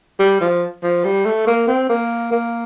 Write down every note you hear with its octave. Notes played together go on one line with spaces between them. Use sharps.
G3
F3
F3
G3
A3
A#3
C4
A#3
A#3